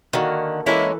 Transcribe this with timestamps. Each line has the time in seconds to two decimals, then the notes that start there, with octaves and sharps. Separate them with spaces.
0.13 D3 D#3 A#3 F#4
0.66 E3 G#3 A#3 C#4 E4 A4 B4